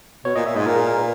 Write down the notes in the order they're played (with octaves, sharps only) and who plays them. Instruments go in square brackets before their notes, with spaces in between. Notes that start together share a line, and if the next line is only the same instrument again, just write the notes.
[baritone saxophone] B2 [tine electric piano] C#5
[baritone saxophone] A#2 [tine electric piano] D#5
[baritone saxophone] A#2 [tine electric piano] E5
[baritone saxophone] G#2 [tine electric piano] D#5
[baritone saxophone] A#2 [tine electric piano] A#4
[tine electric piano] G#4
A#4
B4